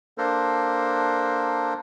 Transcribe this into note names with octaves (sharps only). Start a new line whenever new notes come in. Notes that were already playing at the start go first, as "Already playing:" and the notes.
A#3 D4 A4 A#4 C5